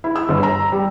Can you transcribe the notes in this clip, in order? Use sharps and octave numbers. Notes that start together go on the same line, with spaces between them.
E4
E6
G1
A#5
G3